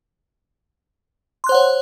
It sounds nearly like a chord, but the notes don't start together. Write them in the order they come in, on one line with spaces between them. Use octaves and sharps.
C6 F#6 C5 F#5 C#5